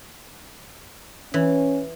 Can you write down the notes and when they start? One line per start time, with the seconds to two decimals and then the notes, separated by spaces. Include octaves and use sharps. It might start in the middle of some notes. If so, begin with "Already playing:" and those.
1.34 E3 C#4